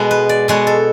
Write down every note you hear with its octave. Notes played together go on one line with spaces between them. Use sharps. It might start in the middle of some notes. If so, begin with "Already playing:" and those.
Already playing: B2 G#3 B3
B4
D5
B2 G#3 B3 C#5
A4